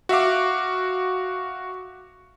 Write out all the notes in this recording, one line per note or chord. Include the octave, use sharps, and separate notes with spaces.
F#4 E5 F5 D6